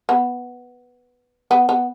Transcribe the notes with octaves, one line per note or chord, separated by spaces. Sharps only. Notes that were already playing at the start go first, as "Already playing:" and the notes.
B3
B3
B3